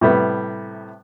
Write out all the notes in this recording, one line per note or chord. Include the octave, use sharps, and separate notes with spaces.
A2 C3 G3 A3 B3